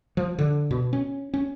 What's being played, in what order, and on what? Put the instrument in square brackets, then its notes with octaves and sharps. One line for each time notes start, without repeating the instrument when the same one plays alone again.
[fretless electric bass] F3
D3
B2
C#4
C#4